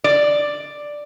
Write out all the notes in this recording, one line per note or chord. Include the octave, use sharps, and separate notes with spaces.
D5